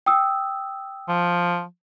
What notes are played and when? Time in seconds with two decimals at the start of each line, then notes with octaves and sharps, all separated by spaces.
0.06 G5 D#6 E6
1.09 F3